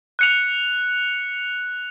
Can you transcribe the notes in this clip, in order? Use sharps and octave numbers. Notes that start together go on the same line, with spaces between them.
F#6 C#7 F7